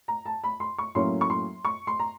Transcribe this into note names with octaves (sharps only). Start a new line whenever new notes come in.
A#5
A5
B5
C6
C#6
A2 F#3 A#3 C#4 E4 C6
C#6
C6
C#6
C6
A#5